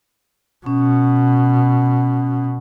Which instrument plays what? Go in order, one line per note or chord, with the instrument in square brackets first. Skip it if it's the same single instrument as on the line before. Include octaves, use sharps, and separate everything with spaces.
[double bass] B2 [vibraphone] C#4